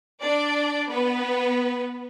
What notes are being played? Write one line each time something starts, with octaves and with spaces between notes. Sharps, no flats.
D4 D5
B3 B4